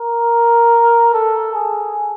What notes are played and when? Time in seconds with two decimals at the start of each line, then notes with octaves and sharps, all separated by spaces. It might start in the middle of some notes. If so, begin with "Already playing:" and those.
Already playing: A#4
1.13 A4
1.54 G#4